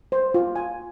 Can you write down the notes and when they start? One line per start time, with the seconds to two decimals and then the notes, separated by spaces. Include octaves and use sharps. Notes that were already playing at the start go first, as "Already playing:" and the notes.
0.12 C5
0.34 F4
0.56 G#5